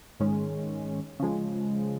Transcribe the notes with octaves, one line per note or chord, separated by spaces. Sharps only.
G#2 D#3 G#3 C#4
C#3 F3 G#3